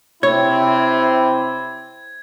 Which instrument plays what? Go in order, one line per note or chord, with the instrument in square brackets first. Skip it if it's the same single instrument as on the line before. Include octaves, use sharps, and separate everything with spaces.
[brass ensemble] C3 C4 [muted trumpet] E4 [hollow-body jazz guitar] C#5 [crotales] G#6